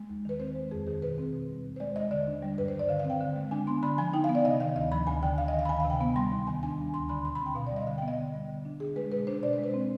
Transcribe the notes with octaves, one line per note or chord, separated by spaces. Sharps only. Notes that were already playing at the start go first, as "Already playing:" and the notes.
Already playing: G#3
D#2
D#3 B4
C4 C5
G#3
F2 G#4
D#3 G#4
B2 B4
C4
B2
G3
D#2
C5
G#3 D5
D#2 D#5
D3 D5
D4
G3
G2 B4
C5
D#3
D5
D3 F5
F5
C4
G5
D3
G#3
D4 G#5
B3 C6
D3 B5
F3 G#5
D#4 G5
F5
B3
D5
C3 D#5
D#3 F5
D2 D#5
F3 B5
D2 G#5
D3 G5
D2 F5
D#5
D#3
F5
B5
D2 G#5
F5
C3
G5
B3 B5
G3 C6
D#2
D#3 G#5
D4 G#5
G3
D2 C6
D3 B5
B2 C6
B5
C4
G5
B2 F5
D5
G3 D#5
D3 F5
G5
B3
D#5
D3
G3
D3
D4
D3 G#4
G#3 B4
B2 B4
D4 C5
B2 D5
C5
G#3
B4
C4